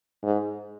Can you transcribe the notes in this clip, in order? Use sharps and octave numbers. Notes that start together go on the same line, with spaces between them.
G#2